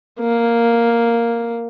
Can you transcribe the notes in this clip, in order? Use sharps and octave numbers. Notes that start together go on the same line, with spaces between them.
A#3